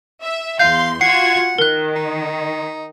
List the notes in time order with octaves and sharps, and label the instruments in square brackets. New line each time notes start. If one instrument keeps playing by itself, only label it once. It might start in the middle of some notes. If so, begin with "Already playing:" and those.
[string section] E5
[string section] E2 C6 [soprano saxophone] F5 [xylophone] G6
[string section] F4 F#4 G#6 [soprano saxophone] F#5 [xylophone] C7
[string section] D#3 [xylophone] A#4 F#6
[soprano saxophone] D#4